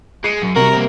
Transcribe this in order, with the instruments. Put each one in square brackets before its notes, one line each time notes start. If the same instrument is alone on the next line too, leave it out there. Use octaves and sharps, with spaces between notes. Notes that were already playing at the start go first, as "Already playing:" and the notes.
[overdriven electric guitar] G#3 [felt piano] C7 C#7 D#7
[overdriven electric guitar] F#2
[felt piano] C3 G3 [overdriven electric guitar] F#4 [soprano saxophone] A#4
[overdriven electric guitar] A#3 C4